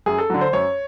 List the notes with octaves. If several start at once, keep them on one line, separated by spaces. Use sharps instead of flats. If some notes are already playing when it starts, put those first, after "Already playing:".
F#2 G#4
A4
D3 F#3
C5
F#2 C#5